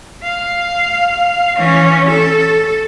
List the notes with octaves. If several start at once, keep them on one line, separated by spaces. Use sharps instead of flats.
F5
E3 C#4
A4